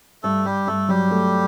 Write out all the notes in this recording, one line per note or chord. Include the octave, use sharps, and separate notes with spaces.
G2 A3 A4
G2 G3 G4
G2 A3 A4
F#3 G3 G4
A3